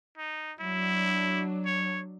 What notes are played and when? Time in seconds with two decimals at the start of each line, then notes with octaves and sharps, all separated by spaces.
0.18 D#4
0.60 F#3 D4 E4
1.66 C#5